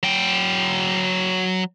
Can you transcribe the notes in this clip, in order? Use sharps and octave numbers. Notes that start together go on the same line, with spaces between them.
F#3 G5